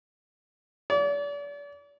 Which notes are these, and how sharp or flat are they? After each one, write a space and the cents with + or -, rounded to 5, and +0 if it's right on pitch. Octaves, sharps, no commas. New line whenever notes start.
D5 -40